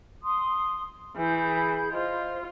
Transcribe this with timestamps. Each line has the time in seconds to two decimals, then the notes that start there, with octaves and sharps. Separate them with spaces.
0.24 C6 D#6
1.16 E3 G#4 B5 G6
1.93 F4 C5 D#5